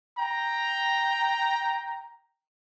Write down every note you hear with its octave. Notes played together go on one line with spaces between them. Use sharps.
G5 A#5